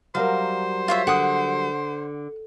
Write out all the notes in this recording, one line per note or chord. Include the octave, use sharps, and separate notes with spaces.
F#3 G3 A#4 C5 F5
F4 C#5 E5
D3 F#5 D#6